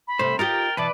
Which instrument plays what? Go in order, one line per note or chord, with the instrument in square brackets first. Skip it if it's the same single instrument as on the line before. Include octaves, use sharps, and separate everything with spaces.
[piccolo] B5
[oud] C3 A3 [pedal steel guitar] C5
[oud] D#4 F4 G4 [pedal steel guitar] A#4 G5 [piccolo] A6
[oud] B2 E3 [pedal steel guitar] B4 D5 [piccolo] A5